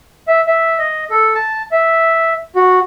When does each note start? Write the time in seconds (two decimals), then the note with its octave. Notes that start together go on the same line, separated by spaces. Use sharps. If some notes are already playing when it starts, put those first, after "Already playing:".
0.28 E5
0.46 E5
0.78 D#5
1.10 A4
1.35 A5
1.72 E5
2.55 F#4